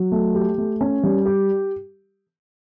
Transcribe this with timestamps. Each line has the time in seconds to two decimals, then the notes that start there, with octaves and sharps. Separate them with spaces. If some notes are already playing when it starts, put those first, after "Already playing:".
Already playing: F#3
0.12 A3
0.35 G4
0.58 A3
0.81 C#4
1.03 G3
1.25 G4